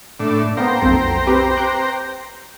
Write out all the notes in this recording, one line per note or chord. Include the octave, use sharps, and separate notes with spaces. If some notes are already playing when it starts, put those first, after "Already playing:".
A2 D4
A#3 B3 C5 G5 A#5
B1 F2 A4
C4 G4 B4
D6 F#6 G6